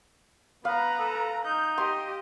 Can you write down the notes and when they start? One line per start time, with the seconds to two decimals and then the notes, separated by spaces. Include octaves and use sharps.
0.65 B3 B4 F5 A#5
0.99 A4
1.45 D#4 G6
1.78 G4 D#5 C6